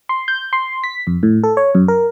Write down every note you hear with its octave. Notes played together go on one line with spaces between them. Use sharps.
C6
G6
C6
B6
F2
A2
A4
C#5
F#2
A#4